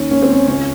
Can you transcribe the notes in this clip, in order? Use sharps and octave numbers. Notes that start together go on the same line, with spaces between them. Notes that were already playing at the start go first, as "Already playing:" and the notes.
Already playing: D#2 D#3 C#4
D#2 C#4
C4
D#3 C#4
C#2 C#4